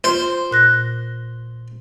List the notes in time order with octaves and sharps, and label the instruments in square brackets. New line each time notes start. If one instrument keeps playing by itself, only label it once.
[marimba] F4 [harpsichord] C5
[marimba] A#2 F#6 A#6